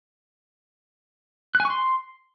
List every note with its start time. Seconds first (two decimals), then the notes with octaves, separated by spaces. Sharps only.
1.55 F#6
1.60 G#5
1.65 C#6
1.70 C6